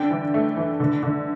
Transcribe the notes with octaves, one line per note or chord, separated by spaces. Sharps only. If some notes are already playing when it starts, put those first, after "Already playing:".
Already playing: D3 D4 G5
E3
A3
E3
D3
D3